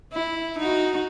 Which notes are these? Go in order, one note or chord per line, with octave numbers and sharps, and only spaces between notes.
E4
D#4 F#4